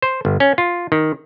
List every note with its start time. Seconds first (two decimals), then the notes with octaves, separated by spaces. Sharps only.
0.02 C5
0.25 G1
0.40 C#4
0.58 F4
0.92 D#3